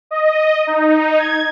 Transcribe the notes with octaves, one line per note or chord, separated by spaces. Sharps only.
D#5
D#4
G#6